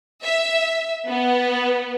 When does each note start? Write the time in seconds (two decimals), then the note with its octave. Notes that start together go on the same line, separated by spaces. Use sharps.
0.24 E5
1.08 B3